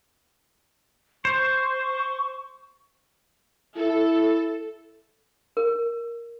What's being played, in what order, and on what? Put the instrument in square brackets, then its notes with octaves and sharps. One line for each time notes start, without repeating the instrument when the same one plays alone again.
[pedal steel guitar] C5 [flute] C#6
[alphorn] E4 [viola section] A4
[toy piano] A#4